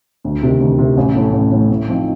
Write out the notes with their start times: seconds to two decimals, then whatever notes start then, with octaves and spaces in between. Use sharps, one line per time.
0.24 D2
0.43 C3 D#3
0.61 D2
0.78 C3 D#3
0.97 A1
1.15 A2 A3
1.33 A1
1.51 A2 A3
1.70 A2
1.88 F3 C4 D#4